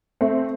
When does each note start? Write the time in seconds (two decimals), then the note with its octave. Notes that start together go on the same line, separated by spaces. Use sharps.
0.21 A3 C4